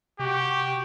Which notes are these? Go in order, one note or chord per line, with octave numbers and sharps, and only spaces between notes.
C3 F#4 G4